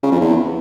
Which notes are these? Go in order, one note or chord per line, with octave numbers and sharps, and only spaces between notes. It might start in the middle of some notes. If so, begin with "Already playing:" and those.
C#3
F2
E2